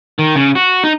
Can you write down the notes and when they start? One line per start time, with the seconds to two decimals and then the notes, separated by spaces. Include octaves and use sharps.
0.19 D#3
0.36 C#3
0.55 F#4
0.84 D#4